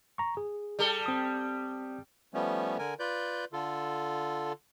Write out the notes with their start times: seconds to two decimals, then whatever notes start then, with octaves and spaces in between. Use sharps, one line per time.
0.18 A#5 C#6
0.37 G#4
0.79 G3 A4
1.06 C4 D#6
2.34 F3 G3 A3 B3 C#4
2.78 D3 A#4 G#5
2.99 F4 B4 D5 G6
3.53 D3 F4 A4